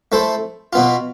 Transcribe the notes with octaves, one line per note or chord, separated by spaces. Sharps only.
A3 E4 A4 C5
B2 B3 F4